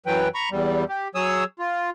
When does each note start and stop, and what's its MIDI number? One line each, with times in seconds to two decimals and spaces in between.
0.06 0.28 42
0.06 0.28 52
0.06 0.28 54
0.06 0.28 71
0.06 0.28 79
0.35 0.49 82
0.35 0.49 83
0.35 0.49 85
0.51 0.84 40
0.51 0.84 55
0.89 1.08 67
1.15 1.44 54
1.15 1.44 68
1.15 1.44 73
1.15 1.44 87
1.15 1.44 88
1.59 1.90 65